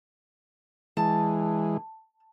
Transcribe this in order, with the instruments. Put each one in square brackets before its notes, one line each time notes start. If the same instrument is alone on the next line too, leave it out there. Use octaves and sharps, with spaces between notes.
[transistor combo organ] E3 G#3 [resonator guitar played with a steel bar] A5